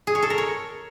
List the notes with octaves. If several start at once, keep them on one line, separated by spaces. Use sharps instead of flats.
G#4
C#5
A4
A#4
C#5